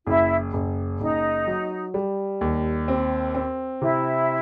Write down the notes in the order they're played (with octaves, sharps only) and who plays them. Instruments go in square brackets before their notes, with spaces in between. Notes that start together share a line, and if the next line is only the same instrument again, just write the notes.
[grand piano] F#1 [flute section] E4
[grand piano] F#1
[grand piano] F#1 [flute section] D#4
[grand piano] F#3
G3
D#2
C4
C4
[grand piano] C3 [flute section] E4